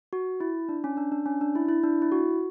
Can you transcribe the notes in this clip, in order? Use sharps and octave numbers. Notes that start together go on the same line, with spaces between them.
F#4
E4
D4
C#4
D4
D4
C#4
D4
E4
E4
D4
E4
F#4